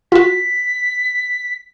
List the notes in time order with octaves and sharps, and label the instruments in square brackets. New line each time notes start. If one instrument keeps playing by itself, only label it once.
[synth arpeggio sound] F4 F#4 [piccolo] B6